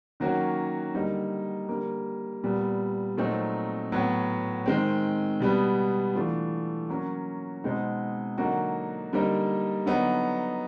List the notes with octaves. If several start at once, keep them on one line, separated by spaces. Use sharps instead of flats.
D#3 F#3 A#3 C#4 F#4
D3 G3 A#3 D#4
D3 G3 A#3
A#2 G3 B3
A#2 F#3 A3 C4 D#4
A2 F#3 B3
D#3 G#3 C4
B2 G3 B3
E3 A3 D4 F4
F#3 A#3 C#4 F#4
B2 G#3 C4 D#4
D3 F#3 A#3 D#4 F#4
D3 G3 A#3 D#4
D3 F#3 B3 D#4